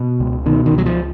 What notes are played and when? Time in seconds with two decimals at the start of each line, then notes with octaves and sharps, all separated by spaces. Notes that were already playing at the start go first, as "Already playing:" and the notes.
Already playing: B2
0.20 C#2
0.46 B2 D#3
0.66 D#3
0.72 C#2
0.78 F#3
0.86 F3